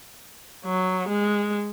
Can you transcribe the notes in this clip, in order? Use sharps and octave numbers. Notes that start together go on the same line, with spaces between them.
F#3
G#3